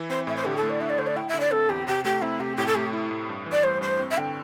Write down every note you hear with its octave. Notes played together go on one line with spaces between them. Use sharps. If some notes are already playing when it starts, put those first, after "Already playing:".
Already playing: E3 E4
C4 C5
A2 E5
C5
D3 G4
A4
A3
D5
D4 E5
D5
D3 C5
D5
E4 G5
E5
D3
D5
C4 A4
E2 G4
C3 G4
A3 G4
C4 E4
C3 G4
A2 G4
A4
A3 G4
E4
A2
G2
E3
D5
G3 C5
G2 C5
C4
E5
D3 G5